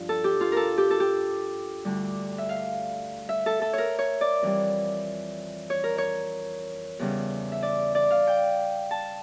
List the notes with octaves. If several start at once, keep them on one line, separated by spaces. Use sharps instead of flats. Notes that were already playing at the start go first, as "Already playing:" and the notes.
Already playing: G2 F3 F4
A4
G4
F4
A4 A#4
G4
A4
G4
D2 D3 G3
E5
F5
E5
A4
A4
A#4 C#5
C#5
D5
F2 E3 G3
C#5
A#4
C#5
E2 C#3 G3
E5
D5
D5
F5
G5
A5